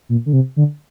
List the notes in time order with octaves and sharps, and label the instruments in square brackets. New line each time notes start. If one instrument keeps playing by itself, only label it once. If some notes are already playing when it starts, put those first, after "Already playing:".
[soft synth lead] A#2
D3
C3
D3